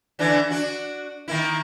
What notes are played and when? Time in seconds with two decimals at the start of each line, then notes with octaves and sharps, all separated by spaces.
0.19 D3 E3 D4
0.51 D4 F#4
1.28 D#3 A#3 E4